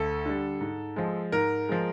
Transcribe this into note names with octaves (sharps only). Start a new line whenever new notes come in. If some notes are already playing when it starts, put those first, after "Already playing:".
Already playing: D2 A4
D3 G3
G#2
F3 G#3
G#2 A#4
F3 G#3